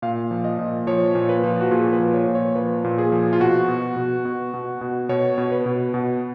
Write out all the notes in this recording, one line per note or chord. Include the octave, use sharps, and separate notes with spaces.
A#2 F5
F3
D#5
A#2
F3 C#5
A#2
B4
F3
F#4
A#2 G#4
B4
F3
C#5
A#2
C#5
F3 B4
A#2
G#4
F3
F4
B2 F#4
B2
B2
B2
B2
B2
B2 C#5
B2
B4
B2
B2